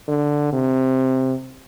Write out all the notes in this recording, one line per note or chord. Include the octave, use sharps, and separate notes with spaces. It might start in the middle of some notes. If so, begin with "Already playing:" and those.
D3
C3